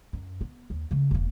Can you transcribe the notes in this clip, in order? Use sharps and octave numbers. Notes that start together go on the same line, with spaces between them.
F#2
B3
D#2
C#3 A3
E1 A#3